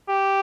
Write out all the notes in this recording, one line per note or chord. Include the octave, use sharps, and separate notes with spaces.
G4